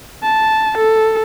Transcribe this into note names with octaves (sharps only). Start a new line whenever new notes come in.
A5
A4